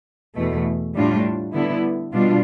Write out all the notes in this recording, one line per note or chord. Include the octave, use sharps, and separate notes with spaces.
E2 B2 A3
A2 G3 D4 F4
D3 G3 B3 E4
B2 G3 D4 F4